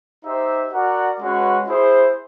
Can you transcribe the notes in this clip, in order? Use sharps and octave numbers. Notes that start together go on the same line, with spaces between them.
D#4 G4 C5 E5
F#4 A#4 D5 F#5
G#3 C#4 F#4 B4
E4 G#4 C5